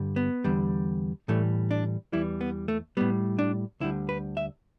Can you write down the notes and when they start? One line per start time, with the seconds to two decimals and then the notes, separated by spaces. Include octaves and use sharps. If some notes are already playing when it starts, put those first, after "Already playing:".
Already playing: G2 D3 G3
0.16 B3
0.44 E2 D3 G3
1.28 A2 E3 G3 A3
1.71 D4
2.12 E2 E3 G3 E4
2.41 B3
2.68 A3
2.97 A2 G3 B3
3.39 D4
3.80 D2 D3 G3 E4
4.09 B4
4.37 E5